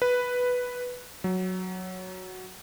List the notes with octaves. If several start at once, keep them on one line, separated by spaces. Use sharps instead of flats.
B4
F#3